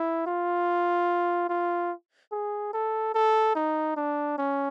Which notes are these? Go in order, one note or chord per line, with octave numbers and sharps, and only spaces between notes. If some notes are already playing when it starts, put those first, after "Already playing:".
Already playing: E4
F4
F4
G#4
A4
A4
D#4
D4
C#4